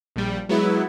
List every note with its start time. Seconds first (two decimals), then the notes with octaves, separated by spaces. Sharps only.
0.16 A#1 G3
0.49 F#3 G#3 B3 E4